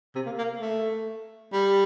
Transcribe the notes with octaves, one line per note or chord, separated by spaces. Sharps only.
C3
A#3
A#3
A3
G3